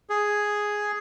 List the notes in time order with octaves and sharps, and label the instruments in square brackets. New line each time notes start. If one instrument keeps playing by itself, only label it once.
[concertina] G#4